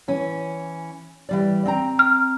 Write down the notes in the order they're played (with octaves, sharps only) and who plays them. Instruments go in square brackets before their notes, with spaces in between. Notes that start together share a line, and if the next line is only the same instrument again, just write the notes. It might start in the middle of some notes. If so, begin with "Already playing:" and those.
[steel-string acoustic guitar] E3 C#4
E3 G3 D5
C4 G5 A#5
[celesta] F6